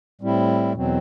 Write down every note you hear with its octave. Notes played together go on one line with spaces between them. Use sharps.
A2 G3 C4 E4
E2 B2 F#3 C4